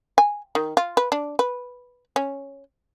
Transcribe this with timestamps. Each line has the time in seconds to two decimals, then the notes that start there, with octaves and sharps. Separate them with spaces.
0.18 G#5
0.55 D#3
0.77 F4
0.97 B4
1.12 D4
1.39 B4
2.16 C#4